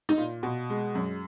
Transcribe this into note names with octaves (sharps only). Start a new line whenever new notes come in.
D#4
A#2
B2
G#3
F#2